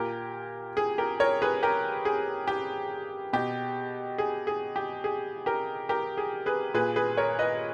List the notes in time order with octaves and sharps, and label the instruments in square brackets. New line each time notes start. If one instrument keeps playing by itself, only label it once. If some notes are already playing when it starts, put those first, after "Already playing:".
Already playing: [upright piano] A#2 G4 A#4
G#4
G4 A#4
A#4 C#5
G#4 B4
G4 A#4
G#4
G4
B2 G4
G#4
G#4
G4
G#4
G4 A#4
G4 A#4
G#4
G#4 B4
A#2 G#4 B4
G#4 B4
A#4 C#5
B4 D#5